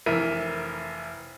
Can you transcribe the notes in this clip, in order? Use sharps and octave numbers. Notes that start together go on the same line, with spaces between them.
F1 E3 A#4 E5 D#7